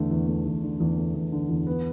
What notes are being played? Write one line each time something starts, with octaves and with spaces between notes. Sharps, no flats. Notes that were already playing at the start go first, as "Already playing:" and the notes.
Already playing: E2 D3 A3
E2
A3
E2
D3
E2
A3
E2
D3
E2
B3